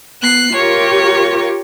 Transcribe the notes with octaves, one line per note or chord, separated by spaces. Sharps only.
B3 F#6 C7
F4 G4 A#4 C#5